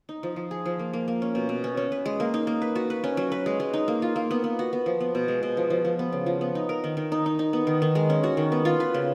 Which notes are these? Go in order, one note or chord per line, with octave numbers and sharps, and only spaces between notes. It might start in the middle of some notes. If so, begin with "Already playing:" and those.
D#4
F3
F3
G#4
F3
A#3
A#3
A#3
C#4
B2
B2
C#4
C#4
B4
G#3
A#3
D#4
A#3
B4
F#4
B4
C#4
F#3
B4
G#3
G#3
D#4
A#3
F4
A#3
B3
B3
F#4
B3
F3
B3
B2
G#3
B2
F3
F3
F3
B3
C#3
F3
B3
D#4
A#4
D#3
D#3
D#4
D#4
D#4
B3
D#3
D#3
G#3
C#4
F#4
D#3
B3
F4
B4
C#3